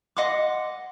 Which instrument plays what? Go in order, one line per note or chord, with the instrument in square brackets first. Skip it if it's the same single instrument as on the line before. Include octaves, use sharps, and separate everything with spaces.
[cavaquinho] D#5 F#5 C6 D6